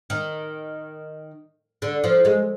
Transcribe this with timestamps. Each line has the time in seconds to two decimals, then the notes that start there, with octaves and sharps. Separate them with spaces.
0.10 D#3
1.82 D3
2.04 F3
2.25 G#3